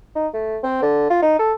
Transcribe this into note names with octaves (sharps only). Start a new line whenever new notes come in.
D#4
A3
C4
D3
F4
D#4
A4